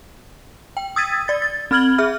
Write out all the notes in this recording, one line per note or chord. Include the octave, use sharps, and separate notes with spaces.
G5
D#6 E6 G#6 A6 B6 D#7
D5 A6
A6
C4 B5 F6 G#6 F#7 G7
G#4 E5 F6